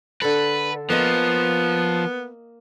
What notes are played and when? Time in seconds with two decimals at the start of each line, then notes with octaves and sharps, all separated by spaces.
0.22 D3 A4 B4
0.90 F3 A#3 B3 D#5